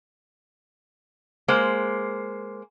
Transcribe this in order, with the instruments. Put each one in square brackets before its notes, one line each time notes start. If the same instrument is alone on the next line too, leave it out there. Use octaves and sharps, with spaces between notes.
[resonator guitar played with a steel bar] G#3 A#3 C5